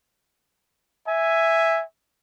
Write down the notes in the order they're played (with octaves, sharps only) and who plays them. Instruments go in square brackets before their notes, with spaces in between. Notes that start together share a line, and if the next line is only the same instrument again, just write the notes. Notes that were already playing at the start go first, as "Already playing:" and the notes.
[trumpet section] E5 G#5